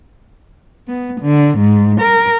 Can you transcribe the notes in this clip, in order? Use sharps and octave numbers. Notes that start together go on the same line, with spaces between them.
B3
D3
G#2
A#4